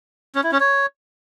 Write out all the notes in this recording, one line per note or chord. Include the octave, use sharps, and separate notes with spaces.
C#4
E4
C#4
C#5